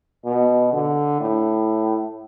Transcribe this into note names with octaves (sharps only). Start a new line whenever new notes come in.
B2
D3
A2